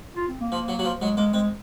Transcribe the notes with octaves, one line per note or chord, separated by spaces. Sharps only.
F4
C4
A#3
F3
F#3
F#3
F3
F#3 G#3
G#3 A#3
G#3 C4